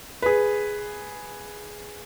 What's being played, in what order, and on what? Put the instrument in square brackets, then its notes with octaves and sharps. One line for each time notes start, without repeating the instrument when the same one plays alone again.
[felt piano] G#4 B4